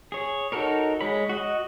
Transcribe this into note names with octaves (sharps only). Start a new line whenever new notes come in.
G#4 C#5
D#4 F#4 A4 A#4 C#5
G#3 C#5 B5
F#4 D#5